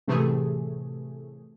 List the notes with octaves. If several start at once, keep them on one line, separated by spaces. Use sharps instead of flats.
A2 C3 E3 A3 G#4